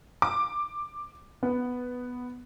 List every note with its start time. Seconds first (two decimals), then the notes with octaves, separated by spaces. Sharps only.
0.22 D6
1.43 B3